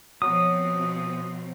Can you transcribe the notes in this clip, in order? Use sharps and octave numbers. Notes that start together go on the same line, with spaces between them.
B2 F3 F#3 C4 D#6